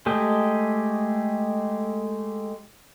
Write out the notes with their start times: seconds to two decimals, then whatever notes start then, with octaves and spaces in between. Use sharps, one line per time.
0.06 G#3 A3 G4 D#5 G5